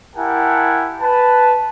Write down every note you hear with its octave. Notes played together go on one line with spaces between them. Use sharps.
E4 G4 A#4 F#5 G#5 A5
B4 A5